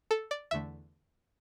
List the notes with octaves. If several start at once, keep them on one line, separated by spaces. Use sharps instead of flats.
A4
D5
E2 D3 A3 E5